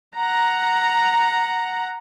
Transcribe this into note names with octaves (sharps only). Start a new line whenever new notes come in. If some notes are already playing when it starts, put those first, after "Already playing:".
F#5 A#5